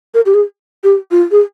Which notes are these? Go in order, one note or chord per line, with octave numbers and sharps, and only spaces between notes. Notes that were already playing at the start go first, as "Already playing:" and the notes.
A#4
G4
G#4
G4
F4
G#4